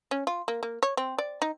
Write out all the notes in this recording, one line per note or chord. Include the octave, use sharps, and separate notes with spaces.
C#4
F4
A#3
A#3
C#5
C4
D5
D#4